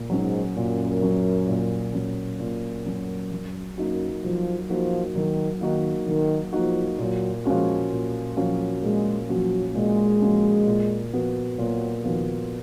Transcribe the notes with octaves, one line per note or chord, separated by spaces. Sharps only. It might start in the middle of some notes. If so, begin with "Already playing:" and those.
Already playing: A#2
G#2 F#3 C#4
F#2 A#2
F#3 C#4
A#2
F#3 C#4
A#2
F#2 F#3 C#4
F#2 F#3
F#2 A#3 D#4 F#4
F3 F#3
F3 A#3 D#4 F#4
D#3 F#3
D#3 A#3 D#4 F#4
D#3 F#3
F3 A#3 D#4 F#4
A#2 F#3
F3 G#3 A#3 C#4 F#4
A#2
F3 F#3 A#3 C#4 F#4
A#2 G#3
F3 F#3 A#3 C#4 F#4
A#2 G#3
F3 A#3 C#4 F#4
A#2
F3 B3 F#4
A#2 F#3
D#3 F3 B3 F#4